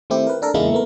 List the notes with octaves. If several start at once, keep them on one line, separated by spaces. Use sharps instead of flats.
D#3 A3 C4 E4 G4
A#4 B4
D4 A4 A#4
E2 C#3 G#3 A#3 D#4 E4
A3 B3 A#4